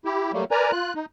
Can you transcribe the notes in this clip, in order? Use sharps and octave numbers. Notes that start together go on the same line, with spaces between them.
E4 G4
F#3 G3 A3 A#3
A#4 B4 D5 G#5 A#5
F4 F#6
D#4